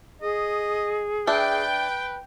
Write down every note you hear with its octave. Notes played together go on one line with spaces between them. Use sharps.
G#4 D#5
D4 B4 E5 G5